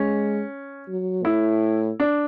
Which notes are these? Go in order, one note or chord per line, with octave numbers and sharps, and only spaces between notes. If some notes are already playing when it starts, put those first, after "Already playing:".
Already playing: G#3 C#4
F#3
A2 E4
D4